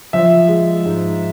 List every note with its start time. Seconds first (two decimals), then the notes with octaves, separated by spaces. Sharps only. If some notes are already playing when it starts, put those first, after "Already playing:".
0.13 F3 E5
0.48 G#3
0.85 G#2